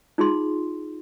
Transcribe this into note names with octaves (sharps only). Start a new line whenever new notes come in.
D#4 F4 G#4 C6